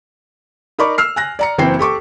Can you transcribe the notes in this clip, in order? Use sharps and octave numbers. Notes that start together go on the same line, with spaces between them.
D#4 A#4 D5 B5 C#6 D6
E6 F6 C7
G#5 F#6 A#6
D5 A#5 C#7
F#1 E3 C4 G5 C7
G4 A4 C#6 D6